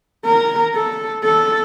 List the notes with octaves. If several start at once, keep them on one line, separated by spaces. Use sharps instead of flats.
A#4
A4
A4